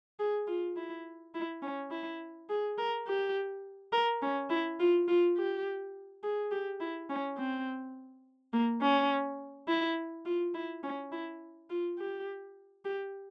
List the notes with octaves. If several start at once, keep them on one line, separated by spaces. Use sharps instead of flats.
G#4
F4
E4
E4
C#4
E4
G#4
A#4
G4
A#4
C#4
E4
F4
F4
G4
G#4
G4
E4
C#4
C4
A#3
C#4
E4
F4
E4
C#4
E4
F4
G4
G4